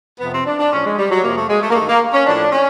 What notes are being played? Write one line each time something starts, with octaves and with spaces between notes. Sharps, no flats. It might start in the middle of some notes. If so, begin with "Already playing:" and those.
F2 C3 F3 B3
C4
D4
D4
A2 F3 C#4
G#3
G3
F#3
F2 C3 F3 A#3
A3
G#3
A3
A#3
G2 D#3 A3
A#3
C#4
A2 F3 D4
C#4